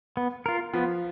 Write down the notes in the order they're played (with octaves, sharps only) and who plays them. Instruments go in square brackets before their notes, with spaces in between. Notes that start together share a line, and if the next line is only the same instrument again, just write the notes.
[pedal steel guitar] B3
F4 A#4
[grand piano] F3 [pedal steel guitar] B3